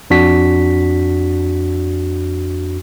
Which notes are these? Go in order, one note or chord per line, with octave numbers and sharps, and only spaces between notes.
F2 D4 F#4 B6